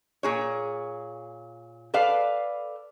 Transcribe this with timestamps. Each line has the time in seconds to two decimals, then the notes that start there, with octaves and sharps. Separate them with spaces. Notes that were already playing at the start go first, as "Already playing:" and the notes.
0.23 A#2 G#4 C#5
1.94 A4 B4 D5 F5